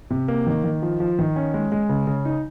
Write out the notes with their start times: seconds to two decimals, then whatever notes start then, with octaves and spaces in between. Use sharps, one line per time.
0.10 C3
0.28 A#3
0.47 D#3
0.64 D#3
0.82 F3
1.00 F3
1.19 D#3
1.36 C#4
1.54 G#3
1.72 G#3
1.89 C#3
2.07 C#3
2.25 D#4